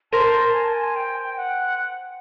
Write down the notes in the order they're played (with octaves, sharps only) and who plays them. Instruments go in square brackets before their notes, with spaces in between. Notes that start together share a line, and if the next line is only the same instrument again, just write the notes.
[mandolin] A#4 C5 [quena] A5
[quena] G#5
A5
G#5
G5
F#5